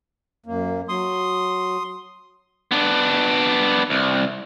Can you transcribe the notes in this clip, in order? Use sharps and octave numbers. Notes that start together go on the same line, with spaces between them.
F#2 A#3
F#3 C6 D#6
B3 D4
C2